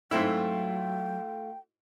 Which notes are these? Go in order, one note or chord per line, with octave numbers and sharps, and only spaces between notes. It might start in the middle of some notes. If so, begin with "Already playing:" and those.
G#2 F#3 A3 C4 E4 F4 G5